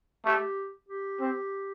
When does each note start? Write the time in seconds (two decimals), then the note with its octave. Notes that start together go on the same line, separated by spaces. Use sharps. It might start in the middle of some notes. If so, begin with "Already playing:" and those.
0.25 A3 G4
0.89 G4
1.21 C4